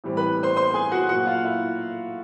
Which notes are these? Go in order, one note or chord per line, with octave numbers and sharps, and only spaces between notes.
A2 E3 G3 C4
B4 B5
C5 C6
C5 C6
G#4 G#5
F#4 F#5
A#2 F#3 A#3 F#4 F#5
F4 F5
E4 E5